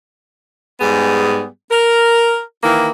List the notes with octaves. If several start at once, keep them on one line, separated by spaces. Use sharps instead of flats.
G#2 G3 B3 G#4
A#4
D#3 E3 A#3 E4